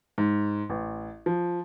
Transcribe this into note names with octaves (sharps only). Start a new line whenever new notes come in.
G#2
A1
F3